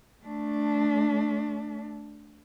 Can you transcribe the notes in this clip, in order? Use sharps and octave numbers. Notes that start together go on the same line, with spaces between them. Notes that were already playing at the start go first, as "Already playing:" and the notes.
A3 D4